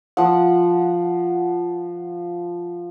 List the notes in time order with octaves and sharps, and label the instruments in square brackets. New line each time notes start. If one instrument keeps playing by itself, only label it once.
[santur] F3 F#5